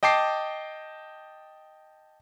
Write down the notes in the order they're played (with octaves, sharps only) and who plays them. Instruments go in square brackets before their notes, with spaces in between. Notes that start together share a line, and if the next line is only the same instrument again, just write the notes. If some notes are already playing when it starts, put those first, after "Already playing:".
[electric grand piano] D#5 G5 A5 D6 C7